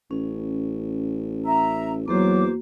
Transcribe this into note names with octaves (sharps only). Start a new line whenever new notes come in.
A1 C#4
E5 A#5
E2 F#3 A#3 F4 F#4 C5 D6